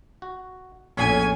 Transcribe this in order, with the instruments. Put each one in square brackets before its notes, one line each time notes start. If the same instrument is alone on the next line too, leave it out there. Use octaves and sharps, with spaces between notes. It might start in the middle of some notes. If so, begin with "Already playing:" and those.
[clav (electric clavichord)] F#4
[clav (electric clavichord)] A#1 F2 A2 [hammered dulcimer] C#4 G#4 [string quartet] G#5